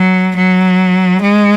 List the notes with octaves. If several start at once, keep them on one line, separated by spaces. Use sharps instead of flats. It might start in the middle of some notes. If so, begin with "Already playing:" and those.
Already playing: F#3
F#3
G#3